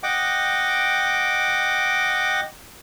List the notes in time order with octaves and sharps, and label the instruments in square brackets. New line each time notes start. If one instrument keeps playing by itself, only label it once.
[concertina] D#5 F#5 G5 D6